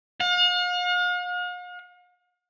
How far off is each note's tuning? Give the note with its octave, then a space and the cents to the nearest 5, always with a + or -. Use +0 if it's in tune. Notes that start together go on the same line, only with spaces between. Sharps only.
F5 +45